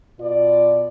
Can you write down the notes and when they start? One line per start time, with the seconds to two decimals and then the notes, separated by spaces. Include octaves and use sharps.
0.19 B2 F4 D5